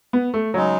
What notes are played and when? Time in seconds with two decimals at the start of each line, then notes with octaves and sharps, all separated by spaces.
0.13 B3
0.34 A3
0.54 C#3 F#3 G#3 D#4